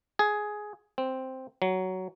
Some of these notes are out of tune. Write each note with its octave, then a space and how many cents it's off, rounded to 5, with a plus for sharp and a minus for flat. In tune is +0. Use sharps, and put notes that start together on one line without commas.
G#4 +10
C4 +0
F#3 +10